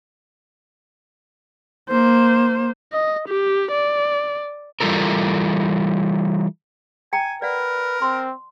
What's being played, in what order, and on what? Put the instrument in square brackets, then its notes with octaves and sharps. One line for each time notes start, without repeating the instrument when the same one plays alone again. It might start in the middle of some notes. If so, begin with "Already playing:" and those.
[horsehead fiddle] A#3 C5
[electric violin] D#5
G4
D5
[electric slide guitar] E3 G3 F4 A4 A#4
[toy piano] G5 A#5 [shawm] G#5
[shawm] A#4 [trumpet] B4 [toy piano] D5 F#5
[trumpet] C4 [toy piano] C6